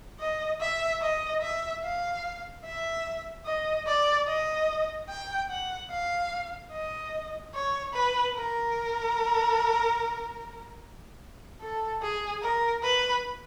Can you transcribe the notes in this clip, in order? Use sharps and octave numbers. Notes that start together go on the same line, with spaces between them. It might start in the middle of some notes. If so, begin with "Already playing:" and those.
D#5
E5
D#5
E5
F5
E5
D#5
D5
D#5
G5
F#5
F5
D#5
C#5
B4
A#4
A4
G#4
A#4
B4